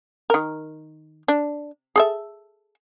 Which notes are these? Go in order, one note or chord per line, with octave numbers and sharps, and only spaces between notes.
D#3 A#4
D4
G#4 A4 E5